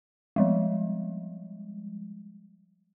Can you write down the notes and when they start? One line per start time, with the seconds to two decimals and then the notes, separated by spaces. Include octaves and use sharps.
0.36 F3 G3 G#3